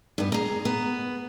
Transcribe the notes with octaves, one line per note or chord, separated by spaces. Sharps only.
G2 B3
G#4 A#5
B3